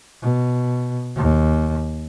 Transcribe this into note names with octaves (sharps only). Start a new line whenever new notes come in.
B2
D#2